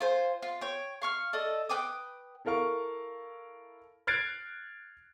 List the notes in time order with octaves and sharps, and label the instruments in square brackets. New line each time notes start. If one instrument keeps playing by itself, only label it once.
[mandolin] F4 C5 G#5
F4
C#5 G5
F5 C#6 F6
A4 D5 D#5
B4 G5 D6 D#6
[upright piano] E4 A4 A#4 F5 C#6
F6 F#6 G#6 A6 C7 D7